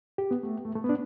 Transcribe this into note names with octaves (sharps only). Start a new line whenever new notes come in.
G4
B3
A3
A3
A3
B3
D4